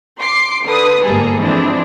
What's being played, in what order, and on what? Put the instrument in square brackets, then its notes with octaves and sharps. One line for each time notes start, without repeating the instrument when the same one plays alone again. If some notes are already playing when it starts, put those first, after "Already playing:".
[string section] C6 D6 C7
D3 B4 D#6
G1 G#2 G3 A#3 G#4 A4
E3 F3 G#3 C4 D4 E4